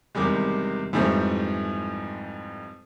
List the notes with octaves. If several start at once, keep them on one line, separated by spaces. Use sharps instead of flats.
E2 C3 D#3 G3 G#3
F2 G#2 E3 G3 A3 C4